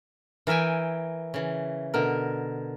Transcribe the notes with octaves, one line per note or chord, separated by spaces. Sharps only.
E3 A#4 E5 G5 G#5
C#3 E3
B2 D3 A#4